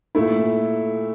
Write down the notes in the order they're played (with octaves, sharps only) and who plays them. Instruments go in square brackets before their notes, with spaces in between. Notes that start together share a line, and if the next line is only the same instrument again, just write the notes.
[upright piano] A#2 A3 E4